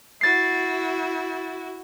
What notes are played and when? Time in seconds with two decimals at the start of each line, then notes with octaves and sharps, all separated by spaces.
0.21 E4 F#4 A6 C7